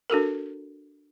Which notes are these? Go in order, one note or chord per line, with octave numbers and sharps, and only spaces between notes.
D4 F#4 A4 A#4